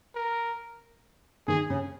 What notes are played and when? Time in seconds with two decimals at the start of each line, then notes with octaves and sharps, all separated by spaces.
0.15 A#4
1.48 D#3 D#4 G#4
1.70 C#3 C#4